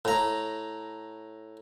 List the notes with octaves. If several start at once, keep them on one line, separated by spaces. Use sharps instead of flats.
A2 A#5